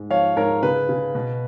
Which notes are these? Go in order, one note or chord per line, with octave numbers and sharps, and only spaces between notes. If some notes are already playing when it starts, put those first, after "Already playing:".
Already playing: G#2
F3 C#5 F5
G#2 A#4 C#5
C#3 B4
C#3
B2